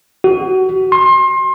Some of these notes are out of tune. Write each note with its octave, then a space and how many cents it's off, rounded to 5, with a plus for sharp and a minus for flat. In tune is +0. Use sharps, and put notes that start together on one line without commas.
F#4 +25
C6 +30